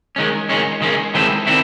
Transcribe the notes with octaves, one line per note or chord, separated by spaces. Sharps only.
D#3 G#3 C#4
D#3 G#3 C#4
D#3 G#3 C#4
D#3 G#3 C4 E4 A4
D#3 C4 E4 A4